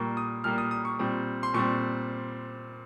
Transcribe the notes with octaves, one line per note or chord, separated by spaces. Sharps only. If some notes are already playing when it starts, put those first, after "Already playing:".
Already playing: A#2 G3 A#3 C#6
D#6
A#2 G3 A#3 F6
D#6
D#6
C#6
A#2 G3 C4
C6
A#2 G3 C4 C#6